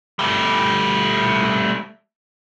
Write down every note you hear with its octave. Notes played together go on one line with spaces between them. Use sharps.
G3 A3